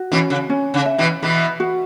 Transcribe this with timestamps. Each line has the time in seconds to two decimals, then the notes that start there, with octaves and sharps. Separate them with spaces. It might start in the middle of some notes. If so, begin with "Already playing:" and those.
Already playing: F#4
0.12 B2 E3 C#4
0.30 C#3
0.50 C#4
0.74 C#3
0.86 E5
0.98 B2 E3
1.23 B2 E3 B4
1.60 F#4